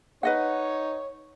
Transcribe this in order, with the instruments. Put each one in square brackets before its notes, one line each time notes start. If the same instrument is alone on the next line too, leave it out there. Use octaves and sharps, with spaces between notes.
[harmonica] D#4 [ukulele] B4 D#5 F#5 [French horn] C#5